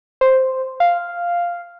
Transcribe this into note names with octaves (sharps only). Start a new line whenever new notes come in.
C5
F5